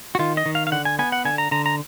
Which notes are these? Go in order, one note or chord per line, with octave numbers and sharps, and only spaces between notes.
F#4
D#3 F4
D#5
D#3
F5
F5
D3 F#5
G#5
B3 G#5
F#5
D3 G#5
A#5
D3 A#5
A#5